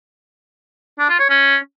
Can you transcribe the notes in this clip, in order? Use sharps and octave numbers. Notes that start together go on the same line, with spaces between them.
D4
F4
C#5
C#4